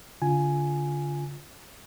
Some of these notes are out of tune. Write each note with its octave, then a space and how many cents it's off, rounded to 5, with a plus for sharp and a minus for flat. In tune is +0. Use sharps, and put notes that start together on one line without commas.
D3 -35 F4 +0 G#5 +5